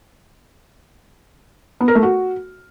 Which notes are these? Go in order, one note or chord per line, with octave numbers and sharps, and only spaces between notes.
B3
A#4
A3
F#4